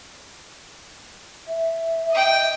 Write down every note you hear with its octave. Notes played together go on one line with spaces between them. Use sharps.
E5
D#5 G5